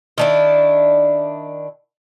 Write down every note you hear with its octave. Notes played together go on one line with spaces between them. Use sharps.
D#3 D4 E4